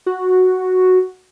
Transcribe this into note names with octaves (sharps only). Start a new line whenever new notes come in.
F#4